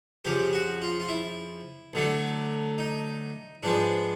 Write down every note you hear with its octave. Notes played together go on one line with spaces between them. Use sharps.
F2 C#3 F3 G4
F#4
F4
F4
E4
D2 D3 F#3 A3
D#4
G#2 F3 G#3 B3 D4